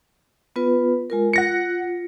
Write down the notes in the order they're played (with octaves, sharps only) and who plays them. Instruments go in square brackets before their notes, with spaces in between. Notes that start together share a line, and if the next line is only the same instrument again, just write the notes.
[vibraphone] B3 F4 B4
G#3 F4 A#4
[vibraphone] F4 [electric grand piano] F#5 A#6 C#7